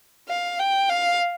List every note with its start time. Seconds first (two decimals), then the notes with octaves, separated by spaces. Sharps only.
0.29 F5
0.59 G5
0.89 F5